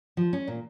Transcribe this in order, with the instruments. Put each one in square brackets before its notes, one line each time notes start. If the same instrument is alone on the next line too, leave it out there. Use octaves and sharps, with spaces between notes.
[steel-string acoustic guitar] F3
C#4
A#2